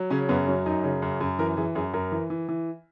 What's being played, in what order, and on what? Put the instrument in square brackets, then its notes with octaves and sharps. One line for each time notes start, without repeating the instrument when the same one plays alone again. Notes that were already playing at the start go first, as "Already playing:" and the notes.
Already playing: [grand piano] F#3
C#3 C#4
F#2 B3
F#3 C#4
F#2 D#4
C#3
F#2
F#2
E3 A#4
E3 G#4
F#2 G#4
F#2 A#4
E3
E3
E3